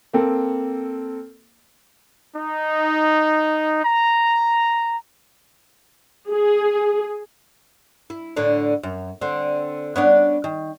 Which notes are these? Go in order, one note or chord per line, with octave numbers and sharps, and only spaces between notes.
A#3 C4 A4
D#4
A#5
G#4
E4
A2 D3 D4
F#2
D3 C4
B3 C#4 D4
D#3